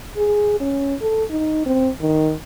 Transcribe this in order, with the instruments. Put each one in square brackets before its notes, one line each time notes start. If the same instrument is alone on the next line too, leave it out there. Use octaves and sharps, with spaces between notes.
[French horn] G#4
C#4
A4
D#4
C4
D#3